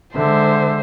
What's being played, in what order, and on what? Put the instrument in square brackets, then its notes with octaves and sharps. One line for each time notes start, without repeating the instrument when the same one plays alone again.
[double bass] D3 G#3 [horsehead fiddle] C5 E5